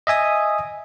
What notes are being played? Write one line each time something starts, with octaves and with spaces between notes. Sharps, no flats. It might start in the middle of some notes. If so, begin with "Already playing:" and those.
D#5 E5 G#5 D#6